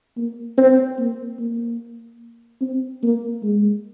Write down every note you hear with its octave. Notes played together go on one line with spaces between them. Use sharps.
A#3
C4
A#3
A#3
C4
A#3
G#3